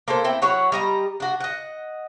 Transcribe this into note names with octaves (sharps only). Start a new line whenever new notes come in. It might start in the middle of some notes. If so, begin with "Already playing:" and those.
A#3 D4 A4 C5
C4 E4 G5
F#3 E4 C#5 F#5
G3 D#5 A#5
D4 F#4
D#5 F#5